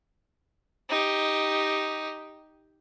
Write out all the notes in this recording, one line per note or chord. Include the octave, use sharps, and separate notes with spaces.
D#4 G4